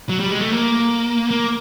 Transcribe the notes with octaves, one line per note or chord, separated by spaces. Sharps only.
F#3
G3
G#3
A3
A#3
A#3